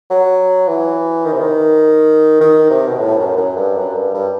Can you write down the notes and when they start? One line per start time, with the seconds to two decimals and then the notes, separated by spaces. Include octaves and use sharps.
0.10 F#3
0.68 E3
1.25 D#3
1.33 C3
1.40 D#3
2.41 D#3
2.70 C3
2.88 B2
2.99 A2
3.18 F#2
3.37 F#2
3.56 G2
3.76 F#2
3.95 G2
4.14 G2